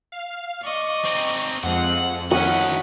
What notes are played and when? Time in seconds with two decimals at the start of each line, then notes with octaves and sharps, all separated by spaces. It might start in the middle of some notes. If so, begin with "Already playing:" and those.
0.12 F5
0.63 D5 D#5 C#6
1.05 C4 D#4
1.63 F2 F3 G#3 C4 F#5
2.31 D2 D#3 C#4 E4 F#4 F#5 D#6